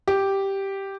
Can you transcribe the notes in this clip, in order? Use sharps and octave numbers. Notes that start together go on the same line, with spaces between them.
G4